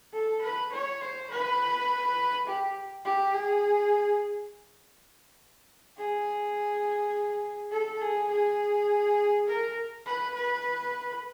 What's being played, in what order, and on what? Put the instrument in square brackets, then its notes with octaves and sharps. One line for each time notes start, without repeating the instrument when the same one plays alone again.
[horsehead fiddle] A4
B4
C#5
C5
B4
G4
G4
G#4
G#4
A4
G#4
G#4
A#4
B4
B4